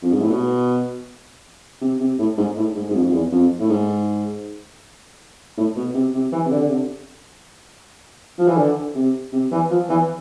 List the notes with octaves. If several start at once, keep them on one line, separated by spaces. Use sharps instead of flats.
F2
G#2
A2
B2
C3
C3
A2
G#2
A2
G#2
G#2
F2
F2
E2
F2
A2
G#2
A2
B2
C3
C3
E3
C3
D3
D3
C3
F3
E3
D3
C3
C3
E3
F3
E3